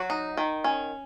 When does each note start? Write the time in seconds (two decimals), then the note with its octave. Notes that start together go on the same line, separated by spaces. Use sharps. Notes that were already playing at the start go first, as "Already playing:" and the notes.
Already playing: F#3 F#4
0.10 D#4
0.37 D#3
0.64 C#4